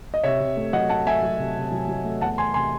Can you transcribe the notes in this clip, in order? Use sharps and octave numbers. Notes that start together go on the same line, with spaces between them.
D#5
C3 C#5 E5
C3
A3
F#3 D#5 F#5
A3 F#5 A5
A3 E5 G#5
F#3
C3
C3
F#3
F#3
A3
E2 F#5 A5
E2 G#5 C6
C3 G#5 C6